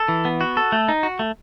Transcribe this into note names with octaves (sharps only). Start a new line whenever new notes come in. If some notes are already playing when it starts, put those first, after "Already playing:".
Already playing: A4
E3
B3
F#4
A4
A3
D#4
F#4
A3